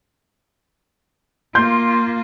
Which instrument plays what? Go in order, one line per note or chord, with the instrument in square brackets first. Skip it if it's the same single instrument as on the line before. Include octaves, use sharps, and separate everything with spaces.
[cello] A#3 F4 [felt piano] C6 G6